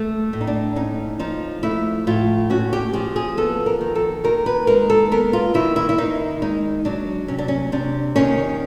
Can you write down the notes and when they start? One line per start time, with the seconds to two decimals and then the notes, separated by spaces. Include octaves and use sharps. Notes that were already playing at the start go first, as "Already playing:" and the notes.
Already playing: A3
0.33 A2
0.41 D#4
0.47 D4
0.76 C#4 D#4
1.19 F3 D#4
1.63 A3 E4
2.07 A2 F4
2.50 C#4 F#4
2.73 G4
2.93 F3 G#4
3.16 G#4
3.37 B3 A4
3.66 A#4
3.81 D#3
3.95 A4
4.24 D#3 A#4
4.46 B4
4.67 G#3 A#4
4.90 A4
5.11 B3 A#4
5.33 F4
5.54 D#3 E4
5.76 E4
5.89 E4
5.98 D#3 D#4
6.42 G#3 D#4
6.85 F#3 D4
7.28 C3 C#4
7.38 D4
7.48 C#4
7.72 C3 D4
8.16 D#3 C#4